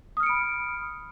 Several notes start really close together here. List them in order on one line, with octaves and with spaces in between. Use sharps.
D#6 F6 C#7 D7 B5